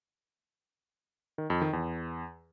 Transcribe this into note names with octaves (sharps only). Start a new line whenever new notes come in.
D#3
F2
D#3
E2